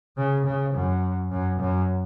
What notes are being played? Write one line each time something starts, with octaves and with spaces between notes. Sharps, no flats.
C#3
C#3
F#2
F#2
F#2